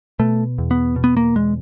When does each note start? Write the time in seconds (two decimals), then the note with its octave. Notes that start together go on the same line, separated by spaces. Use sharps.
0.19 B2 A3
0.58 E2
0.71 B3
0.96 B2
1.04 B3
1.17 A#3
1.35 E2 G#3